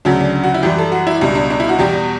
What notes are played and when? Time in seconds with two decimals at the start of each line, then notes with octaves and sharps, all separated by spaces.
0.05 D2 C#3 F#3 D4
0.21 D4
0.44 F#4
0.54 E4
0.63 F#2 E3 G3 G4
0.78 A4
0.92 F#4
1.07 E4
1.21 C#2 B2 G3 D4
1.35 D4
1.50 D4
1.60 E4
1.69 F#4
1.78 E2 B2 G3 G4